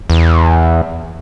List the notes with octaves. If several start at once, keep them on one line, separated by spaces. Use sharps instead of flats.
E2